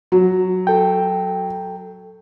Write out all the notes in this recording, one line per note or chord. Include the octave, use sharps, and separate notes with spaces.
F#3
A4 G5